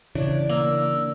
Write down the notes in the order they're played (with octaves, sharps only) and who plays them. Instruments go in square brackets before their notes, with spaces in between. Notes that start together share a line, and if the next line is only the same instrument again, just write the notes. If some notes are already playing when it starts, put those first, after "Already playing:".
[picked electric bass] C#3 E3 [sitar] D4 [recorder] C#5
[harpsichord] A#3 [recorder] E6